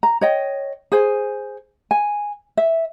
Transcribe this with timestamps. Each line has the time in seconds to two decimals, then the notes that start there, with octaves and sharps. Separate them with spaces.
0.03 A#5
0.21 C#5 D#5 G5
0.92 G#4 C5 G#5
1.91 G#5
2.57 E5